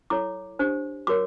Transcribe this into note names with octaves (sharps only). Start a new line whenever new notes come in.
E4 A4 C#5 D6
D4 G4 C5
F#4 A#4 C#5 D6